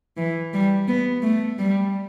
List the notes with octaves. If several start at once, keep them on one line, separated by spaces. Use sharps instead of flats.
E3
G3
B3
A3
G3